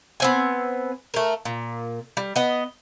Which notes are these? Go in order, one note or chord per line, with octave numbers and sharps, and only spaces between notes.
B3 C4 G#5
A3 A#4
A#2
G3
B3 D#5